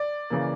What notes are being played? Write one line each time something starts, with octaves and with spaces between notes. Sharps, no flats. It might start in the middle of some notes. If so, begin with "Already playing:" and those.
Already playing: D5
C#3 E3 A#3